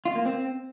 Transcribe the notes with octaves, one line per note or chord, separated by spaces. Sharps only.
F4
A#3
C4